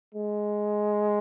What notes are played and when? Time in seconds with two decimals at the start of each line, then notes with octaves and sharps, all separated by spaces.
0.14 G#3